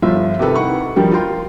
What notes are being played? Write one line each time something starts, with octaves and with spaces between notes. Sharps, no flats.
G1 F3 F4 E5
C3 D#3 G4 A4 B4
D#4 E4 F#5 C#6
D#3 F3 G3 G4 A#4
F4 A#4 G5 C6